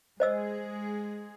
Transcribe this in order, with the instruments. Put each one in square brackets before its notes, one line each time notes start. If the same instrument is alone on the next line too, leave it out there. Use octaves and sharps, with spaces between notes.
[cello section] G#3 G#4 [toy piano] C5 D#5 E6